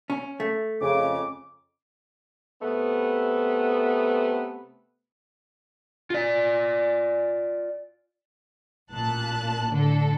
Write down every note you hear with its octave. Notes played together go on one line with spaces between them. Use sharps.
C#4
A3
F2 C#3 D6
C3 A3 B3
F4 D5
A1 A#2 A5 F#6
A2 D3 D4 A4